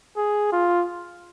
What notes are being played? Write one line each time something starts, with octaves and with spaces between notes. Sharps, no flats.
G#4
F4